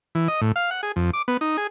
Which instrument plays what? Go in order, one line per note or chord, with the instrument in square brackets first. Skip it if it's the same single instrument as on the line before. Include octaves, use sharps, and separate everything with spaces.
[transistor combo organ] E3
D#5
A2
F5
F#5
G#4
F2
D6
B3
D#4
G#4